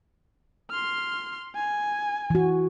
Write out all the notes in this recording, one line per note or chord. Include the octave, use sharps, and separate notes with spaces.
C6 F6
G#5
E3 F#4